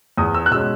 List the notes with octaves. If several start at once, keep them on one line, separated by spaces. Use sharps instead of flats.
E2 D#6
E6
F#6
B2 G#3 C#4 E6